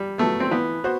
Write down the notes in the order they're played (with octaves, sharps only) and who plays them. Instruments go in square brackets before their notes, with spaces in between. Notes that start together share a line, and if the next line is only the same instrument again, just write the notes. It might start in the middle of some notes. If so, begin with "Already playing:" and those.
Already playing: [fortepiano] G3
[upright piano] F#3 B3 [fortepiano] A3
[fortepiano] C4
[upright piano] E3 [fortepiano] B3
[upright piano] B3 F#4 C5